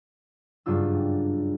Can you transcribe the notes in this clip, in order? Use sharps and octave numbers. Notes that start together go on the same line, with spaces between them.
F#1 G2 D4 F4 E6